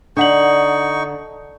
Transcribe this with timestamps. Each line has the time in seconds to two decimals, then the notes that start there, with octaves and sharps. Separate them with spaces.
0.17 D3 D4 D#4 F#5 C#6 F#7